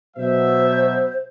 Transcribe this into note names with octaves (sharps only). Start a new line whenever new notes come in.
B2 F#3 C5 E5